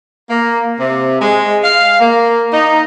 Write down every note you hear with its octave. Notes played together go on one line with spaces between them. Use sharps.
A#3
C3
G#3
F5
A#3
D#4